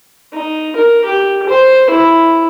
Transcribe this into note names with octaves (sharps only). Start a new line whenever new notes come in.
D#4
A#4
G4
C5
E4